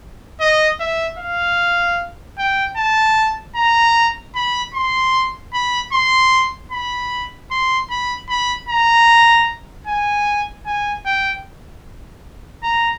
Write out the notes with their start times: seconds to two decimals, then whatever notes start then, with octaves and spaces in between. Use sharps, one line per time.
0.41 D#5
0.80 E5
1.19 F5
2.38 G5
2.77 A5
3.56 A#5
4.35 B5
4.74 C6
5.54 B5
5.93 C6
6.72 B5
7.51 C6
7.90 B5
8.29 B5
8.69 A#5
9.87 G#5
10.66 G#5
11.06 G5
12.63 A#5